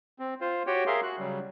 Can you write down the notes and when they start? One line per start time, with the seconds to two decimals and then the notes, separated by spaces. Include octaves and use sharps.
0.19 C4
0.41 F4 C5
0.67 F#4 G4 C#5 G5
0.87 G#4 A#4 E5 F5 C6
1.03 F#4 F#6
1.18 C#3 F#3 G3